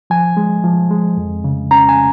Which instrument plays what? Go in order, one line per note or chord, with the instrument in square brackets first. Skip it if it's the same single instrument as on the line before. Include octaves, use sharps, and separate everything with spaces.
[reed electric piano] F3 G#5
G#3
F3
G#3
F2
C#3
C#4 A#5
G#5